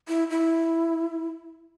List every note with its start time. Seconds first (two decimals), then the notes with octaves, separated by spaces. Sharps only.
0.08 E4
0.30 E4